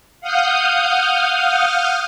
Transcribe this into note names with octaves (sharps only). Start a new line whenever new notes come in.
F5 F#5 D#6 F6 G6